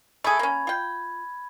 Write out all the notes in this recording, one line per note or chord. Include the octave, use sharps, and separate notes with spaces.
A3 G#4 B5 G#6
A#3 C#4
F4 G5